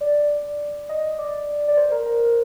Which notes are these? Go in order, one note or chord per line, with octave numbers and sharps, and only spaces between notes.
D5
D#5
D5
D5
C5
A#4
A#4